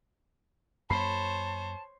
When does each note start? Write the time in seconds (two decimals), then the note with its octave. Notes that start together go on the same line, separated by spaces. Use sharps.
0.90 F#2 A#3 C5 C#5 A5 B5 C7